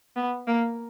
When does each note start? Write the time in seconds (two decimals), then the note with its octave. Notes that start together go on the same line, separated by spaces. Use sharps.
0.16 B3
0.47 A#3